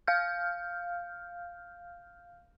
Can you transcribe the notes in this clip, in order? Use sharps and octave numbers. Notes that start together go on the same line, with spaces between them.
F5 F6 G6